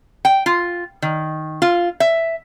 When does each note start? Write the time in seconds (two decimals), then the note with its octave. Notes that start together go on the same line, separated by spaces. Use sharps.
0.25 G5
0.46 F4
1.02 D#3
1.62 F4
2.00 E5